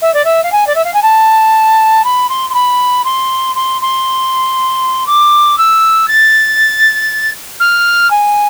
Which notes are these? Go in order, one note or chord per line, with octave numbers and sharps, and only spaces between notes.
E5
D5
E5
F5
G#5
D5
E5
F5
G#5
A5
B5
C6
C6
B5
C6
C6
C6
D6
E6
A6
F6
G#5